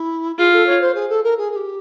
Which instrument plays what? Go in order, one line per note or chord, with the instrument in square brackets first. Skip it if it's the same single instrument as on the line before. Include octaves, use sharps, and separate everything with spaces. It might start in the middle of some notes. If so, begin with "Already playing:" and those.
Already playing: [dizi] E4
[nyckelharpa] F4 [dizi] G#4
[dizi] A4
C#5
C5
G#4
A4
A#4
G#4
G#4
G4